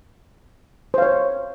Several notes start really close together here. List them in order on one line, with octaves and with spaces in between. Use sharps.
C5 F5 C#5